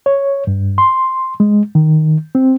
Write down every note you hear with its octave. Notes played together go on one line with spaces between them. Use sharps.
C#5
G2
C6
G#3
D#3
C4